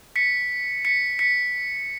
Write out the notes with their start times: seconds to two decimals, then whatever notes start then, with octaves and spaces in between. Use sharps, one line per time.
0.16 B6 C#7
0.85 B6 C#7
1.19 B6 C#7